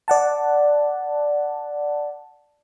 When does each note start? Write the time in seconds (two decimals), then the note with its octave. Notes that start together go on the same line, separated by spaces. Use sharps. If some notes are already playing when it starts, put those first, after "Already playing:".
0.08 D5 F#5 A5